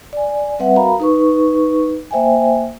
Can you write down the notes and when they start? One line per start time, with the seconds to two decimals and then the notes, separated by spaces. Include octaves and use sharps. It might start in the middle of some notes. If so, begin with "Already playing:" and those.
0.13 D5 G#5
0.59 G3 C4 B4 E5 F#5
0.76 F#4 A#4 F5 A#5 B5
1.00 D#4 B4 C#6
2.11 A#3 C5 E5 G5 G#5